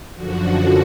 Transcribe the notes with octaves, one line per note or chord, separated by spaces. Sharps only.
F#2 D3 F3 F#4